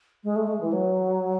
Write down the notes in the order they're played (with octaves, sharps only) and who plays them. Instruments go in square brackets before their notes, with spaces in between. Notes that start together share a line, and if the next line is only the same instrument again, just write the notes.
[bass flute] G#3
A3
G#3
E3
F#3